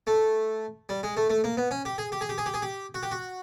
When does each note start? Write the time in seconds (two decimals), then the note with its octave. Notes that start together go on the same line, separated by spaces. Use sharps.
0.07 A3
0.89 G3
1.03 G#3
1.17 A3
1.30 A3
1.44 A#3
1.57 B3
1.71 C#4
1.85 G4
1.98 G#4
2.12 G4
2.21 G#4
2.29 G4
2.38 G#4
2.46 G4
2.54 G#4
2.62 G4
2.94 F#4
3.03 G4
3.11 F#4